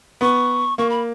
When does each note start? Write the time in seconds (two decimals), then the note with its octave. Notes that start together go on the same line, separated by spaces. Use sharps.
0.21 B3 C#6
0.78 A#3 C#6
0.90 B5